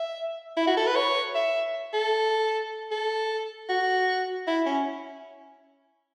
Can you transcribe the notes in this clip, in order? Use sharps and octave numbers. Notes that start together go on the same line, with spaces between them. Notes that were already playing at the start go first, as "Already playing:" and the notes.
Already playing: E5
E4
F#4
A4
B4
C#5
E5
A4
A4
F#4
E4
C#4